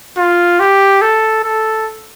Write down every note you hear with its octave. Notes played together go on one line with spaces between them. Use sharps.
F4
G4
A4
A4